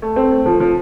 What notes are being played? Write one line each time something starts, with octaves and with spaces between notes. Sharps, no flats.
A3
C4
A3
F3
F3